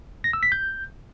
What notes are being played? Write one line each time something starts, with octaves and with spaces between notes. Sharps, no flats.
A#6
E6
B6
G6